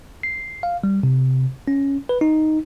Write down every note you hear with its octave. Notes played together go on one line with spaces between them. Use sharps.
C7
F5
G3
C3
C#4
B4
D#4